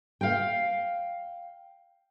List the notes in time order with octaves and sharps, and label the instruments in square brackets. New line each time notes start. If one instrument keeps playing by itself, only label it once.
[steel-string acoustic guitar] F5 G5